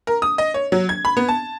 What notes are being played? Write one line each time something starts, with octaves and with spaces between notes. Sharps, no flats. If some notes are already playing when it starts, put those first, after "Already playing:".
A#4
D#6
D#5
C#5
F#3
G#6
B5
B3
A5